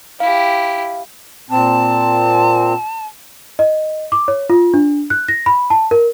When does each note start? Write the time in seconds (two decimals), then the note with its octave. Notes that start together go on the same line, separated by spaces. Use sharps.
0.20 E4 G4 F5
1.50 A#2 C4 A5
3.59 D#5
4.12 D6
4.28 C#5
4.50 F4
4.74 D4
5.10 F#6
5.28 A#6
5.46 B5
5.70 A5
5.91 A#4